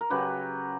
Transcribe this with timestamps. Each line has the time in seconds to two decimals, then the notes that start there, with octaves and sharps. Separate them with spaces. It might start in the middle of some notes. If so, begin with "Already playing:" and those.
0.01 A#4
0.10 C#3 F#3 G4 B4